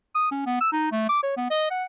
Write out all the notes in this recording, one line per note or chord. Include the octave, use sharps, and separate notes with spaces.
D#6
C#4
B3
E6
D#4
A3
D6
C#5
B3
D#5
F#5